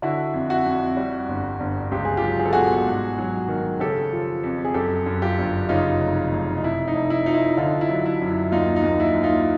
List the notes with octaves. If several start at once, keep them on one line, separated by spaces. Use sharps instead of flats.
D3 E4 F#4
F2
E4 F#4
F2
G3
G1
G1
C#2 G4
G#4
F4 G4
F#3
G#4
A4
B2 F#4 G#4
G#2
F#3
D#3
C#3 G4 A4
F3
F2
G#4
F#2 G4 A4
F#2
F4 G4
G1
C#3 D#4 F4
F1
F1
D#4
F1 E4
D#4
F1
E4
F3 D#4
E4
D3 D#4 F4
E4
F#3
E4
F#2
E4
D#2 D#4 F4
D#4
D#2
E4
D#2
D#4 F4